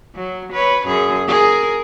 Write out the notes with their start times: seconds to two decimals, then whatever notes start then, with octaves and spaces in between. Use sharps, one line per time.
0.15 F#3
0.52 B4 C#5
0.86 F#2 G#4
1.28 G#4 A#4